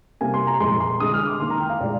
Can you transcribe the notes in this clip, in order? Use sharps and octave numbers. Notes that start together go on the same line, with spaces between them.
C3 G3 A#3 G#5
C6
A#5
A#2 F3 G#3 C6
C6
D3 G#3 D#6
F6
D6
D#3 A#3 C6
A#5
G5
F5
A#2 G#3 D5